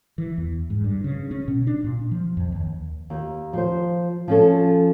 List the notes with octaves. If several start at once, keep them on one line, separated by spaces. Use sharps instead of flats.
E3
E2
G#2
G2
C#3
C#4
B2
D4
A#2
F3
F2
D#2
D#2
F3 C5
F3 C#4 A4